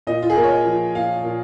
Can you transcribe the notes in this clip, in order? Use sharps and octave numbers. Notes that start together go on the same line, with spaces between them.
A#2 D#5
F4
G#4
A#3 A#4
C#5
D#5
F3
A#2 F5
A#2